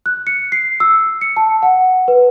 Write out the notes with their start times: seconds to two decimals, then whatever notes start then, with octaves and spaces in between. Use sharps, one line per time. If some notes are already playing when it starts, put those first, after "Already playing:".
0.06 F#6
0.27 C#7
0.52 C7
0.80 E6
1.21 C#7
1.37 A5
1.63 F#5
2.08 B4